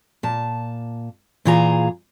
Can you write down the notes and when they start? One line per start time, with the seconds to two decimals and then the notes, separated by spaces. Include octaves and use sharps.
0.23 A#2 A5
1.45 A#2 E3 F4 G#4 A#5